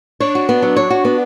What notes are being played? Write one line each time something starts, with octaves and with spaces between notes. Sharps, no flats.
D4 C#5
F#4
B3
F#3
C#5
F#4
B3